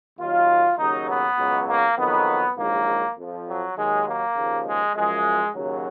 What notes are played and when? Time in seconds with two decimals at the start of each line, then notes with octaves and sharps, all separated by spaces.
0.19 D#2 D#3 F#3 F4
0.78 D#2 C#3 F#3 D#4
1.09 B3
1.38 C#2 B2 F#3
1.68 A#3
1.98 F2 D#3 F#3 B3
2.58 A#1 G#2 D#3 F#3 A#3
3.17 F2 F3
3.47 F#3
3.76 D#2 D#3 F#3 G#3
4.07 A#3
4.36 D#2 C#3 F3
4.66 G#3
4.96 F#2 F3 G#3
5.55 D#2 C#3 F#3